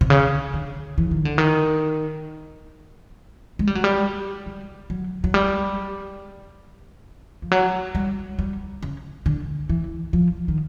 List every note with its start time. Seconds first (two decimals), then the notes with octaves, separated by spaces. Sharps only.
0.01 C3
0.10 C#3
0.54 D3
0.98 E3
1.11 D#3
1.25 D3
1.38 D#3
3.59 G#3
3.67 G3
3.75 F#3
3.84 G3
4.46 G3
4.90 F#3
5.24 F#3
5.34 G3
7.42 F3
7.52 F#3
7.95 G3
8.39 G3
8.83 C#3
9.26 D3
9.69 E3
10.13 F3
10.48 D#3